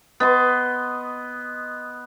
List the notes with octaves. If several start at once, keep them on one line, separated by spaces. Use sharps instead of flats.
B3 D#5 C6